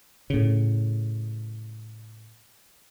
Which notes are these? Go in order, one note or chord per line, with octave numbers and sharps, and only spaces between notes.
A2 C#3